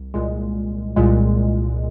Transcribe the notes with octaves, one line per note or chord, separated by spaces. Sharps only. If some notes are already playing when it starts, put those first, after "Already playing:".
Already playing: C2
C2 A#2 G#3
C2 A#2 G#3